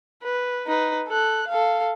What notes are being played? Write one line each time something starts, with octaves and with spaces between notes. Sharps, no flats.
B4
D#4 B4
A4 F#6
A4 F5